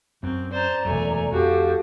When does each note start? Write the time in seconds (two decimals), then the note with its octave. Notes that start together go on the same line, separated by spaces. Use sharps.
0.23 F#2 C4
0.52 C5 D5 A5 A#5
0.85 E1 F#2 A3 G#5
1.32 F2 F#4 G4 A4 F5